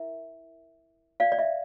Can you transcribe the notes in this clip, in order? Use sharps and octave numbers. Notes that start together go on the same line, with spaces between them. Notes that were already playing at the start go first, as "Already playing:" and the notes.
Already playing: E4 A#4 E5
D5 F5
D5
E5